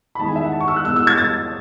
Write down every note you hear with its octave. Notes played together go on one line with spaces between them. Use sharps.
B5
E2 D#3 G#3 D#4 A5
G#5
E5
F#5
A5
C#6
E6
F#6
E2 B2 G#3 E6
E6
G#6
A6